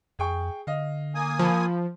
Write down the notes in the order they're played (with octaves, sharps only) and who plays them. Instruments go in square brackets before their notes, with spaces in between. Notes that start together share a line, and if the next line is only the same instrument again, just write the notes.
[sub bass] F2 [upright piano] G#4 G5 C#6
[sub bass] D3 [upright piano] D#5 F5
[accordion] A#3 G#5 D#6
[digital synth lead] F3 [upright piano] A5 B5